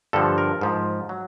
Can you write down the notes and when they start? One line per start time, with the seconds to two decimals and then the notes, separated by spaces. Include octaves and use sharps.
0.13 G2 D3 F3 A4
0.38 A#4
0.61 G#2 F3
1.09 F#3